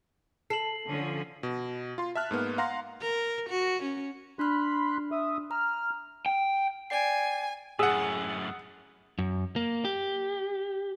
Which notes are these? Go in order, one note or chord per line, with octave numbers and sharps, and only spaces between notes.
A4 C7 F#7
D3 F3 C#4
B2
F4 C6
E5 A5 F6 F#6
G#2 A#3 B3
F5 F#5 A#5 C6 A#6
A#4
F#4
C#4
D4 B5 C6 F6 F#6
E5 D#6
A#5 F6
G5
D5 G5 G#5 C7
F#2 A2 G#4 F#5 E6
F#2
A#3
G4